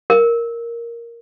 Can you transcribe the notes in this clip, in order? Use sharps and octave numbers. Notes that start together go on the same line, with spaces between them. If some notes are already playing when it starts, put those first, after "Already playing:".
A#4